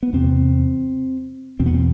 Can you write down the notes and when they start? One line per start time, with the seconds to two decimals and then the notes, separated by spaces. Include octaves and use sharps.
0.03 B3
0.13 E2 C3 C4
1.60 E2 B2 C4
1.66 B3
1.74 C4